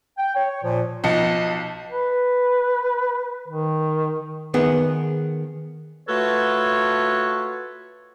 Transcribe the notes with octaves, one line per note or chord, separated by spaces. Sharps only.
G5
C#5
A#2 F3
B1 F3 D#5 C#7
B4
D#3
D#3 B3 G#4
A3 F4 F#4 A4 B4 C#5